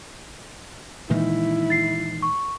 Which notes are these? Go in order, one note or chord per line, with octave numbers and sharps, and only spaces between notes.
A#2 D#3 E3 G#3 D#4 E4
A6 C7
C#6